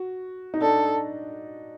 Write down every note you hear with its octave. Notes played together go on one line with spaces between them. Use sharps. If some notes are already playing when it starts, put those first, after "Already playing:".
Already playing: F#4
D#4
D4 A4